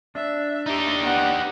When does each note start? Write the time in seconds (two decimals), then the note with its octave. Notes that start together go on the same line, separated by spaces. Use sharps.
0.15 D4 E5
0.66 D#4 G4
1.02 B3 F#5